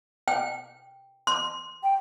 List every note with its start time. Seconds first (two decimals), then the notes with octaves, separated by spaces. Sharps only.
0.28 G5
1.27 C6
1.84 G5